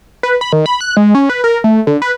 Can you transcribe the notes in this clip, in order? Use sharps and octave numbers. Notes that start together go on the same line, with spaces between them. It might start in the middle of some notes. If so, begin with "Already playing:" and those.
B4
B5
D#3
B5
F#6
G#3
C#4
B4
A#4
A3
D3
B4